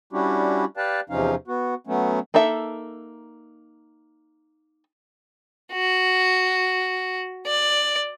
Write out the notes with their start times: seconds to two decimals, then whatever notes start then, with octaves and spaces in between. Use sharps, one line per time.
0.13 G3 C#4 D4 E4 F#4 G4
0.77 G4 B4 D5 F5 G5 A5
1.10 E2 C3 F3 C#4 D#4 F5
1.48 B3 F#4
1.87 F#3 A3 B3 C#4
2.34 A#3 D#4 A4 E5
5.72 F#4
7.46 D5